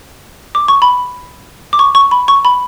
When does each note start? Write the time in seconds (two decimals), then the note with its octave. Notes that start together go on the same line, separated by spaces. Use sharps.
0.55 D6
0.68 C#6
0.82 B5
1.73 D6
1.79 C#6
1.95 C#6
2.11 B5
2.28 C#6
2.45 B5